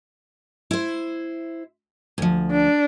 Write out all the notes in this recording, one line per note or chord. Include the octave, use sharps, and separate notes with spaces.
E4 C5
D2 F3
D4